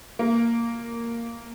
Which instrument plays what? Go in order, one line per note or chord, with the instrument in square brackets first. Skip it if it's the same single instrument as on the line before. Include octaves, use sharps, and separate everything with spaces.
[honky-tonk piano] A#3